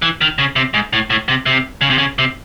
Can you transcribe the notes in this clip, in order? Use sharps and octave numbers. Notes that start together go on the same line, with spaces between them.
E3
D#3
C#3
C3
G#2
A2
A2
C3
C3
C#3
C3
C#3
C3